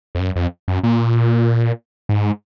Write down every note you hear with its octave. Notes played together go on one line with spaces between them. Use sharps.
F2
F#2
F2
F#2
A#2
G#2